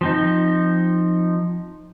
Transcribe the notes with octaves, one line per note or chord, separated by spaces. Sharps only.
F3 C4 D#4